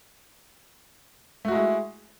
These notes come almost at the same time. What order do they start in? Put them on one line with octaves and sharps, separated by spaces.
A3 F#4 G#3 E4